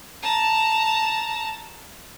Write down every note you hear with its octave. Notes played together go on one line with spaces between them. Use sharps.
A5 A#5